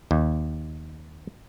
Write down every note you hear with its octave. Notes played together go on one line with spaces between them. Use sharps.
D#2